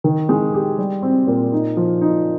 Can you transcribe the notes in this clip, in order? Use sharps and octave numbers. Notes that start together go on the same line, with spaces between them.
D#3
G#3
G4
G3
C4
A#2
D#4
F3
D#4